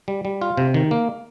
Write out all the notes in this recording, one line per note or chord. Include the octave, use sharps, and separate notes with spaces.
G3
G3
F4
C3
D#3
A#3